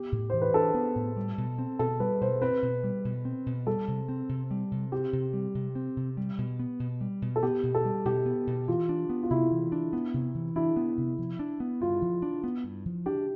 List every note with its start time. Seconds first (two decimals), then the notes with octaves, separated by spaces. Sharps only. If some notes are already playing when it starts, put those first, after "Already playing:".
Already playing: B3 G4
0.12 A2
0.30 E3 C5
0.42 B4
0.54 D4 A4
0.74 B3
0.95 A2
1.17 G3
1.38 B2
1.58 C4
1.79 B2 A4
2.00 G3 B4
2.21 B2 C5
2.41 C4 B4
2.62 B2
2.84 G3
3.05 B2
3.25 C4
3.46 B2
3.66 G3 A4
3.88 C3
4.09 C4
4.29 C3
4.51 G3
4.71 C3
4.92 C4 G4
5.13 C3
5.33 G3
5.55 C3
5.75 C4
5.97 C3
6.17 G3
6.38 B2
6.59 B3
6.80 B2
7.01 G3
7.22 B2
7.36 A4
7.43 B3 G4
7.63 B2
7.75 A4
7.85 G3
8.05 B2 G4
8.26 B3
8.47 B2
8.68 E3 F4
8.89 D4
9.10 B3
9.23 F4
9.30 C3 E4
9.51 E3
9.72 D4
9.93 B3
10.14 C3
10.35 E3
10.56 D4 E4
10.77 B3
10.98 C3
11.18 F3
11.39 D4
11.60 B3
11.81 G2 F4
12.02 F3
12.22 D4
12.44 B3
12.64 G2
12.86 F3
13.06 D4 G4